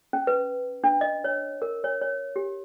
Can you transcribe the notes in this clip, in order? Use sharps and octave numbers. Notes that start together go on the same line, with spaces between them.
C#4
B4
D4
D#5
C#5
A#4
C#5
C#5
G4